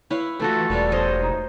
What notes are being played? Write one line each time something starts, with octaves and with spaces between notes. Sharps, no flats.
E4 B4 C#5 F5
E3 A3 F4 F#4 A4
E1 G3 A#4 B4
C5 C#5 D#5
D#4